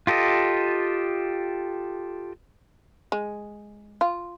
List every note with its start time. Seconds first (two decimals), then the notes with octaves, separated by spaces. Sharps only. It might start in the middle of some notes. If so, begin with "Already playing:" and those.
0.07 F4 G4 A4 D#5
3.12 G#3
4.01 F4